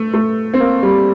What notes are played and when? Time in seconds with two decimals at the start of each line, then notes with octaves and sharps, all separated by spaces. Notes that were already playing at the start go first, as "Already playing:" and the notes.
Already playing: A3
0.14 A3
0.54 C4
0.60 A#3
0.83 G3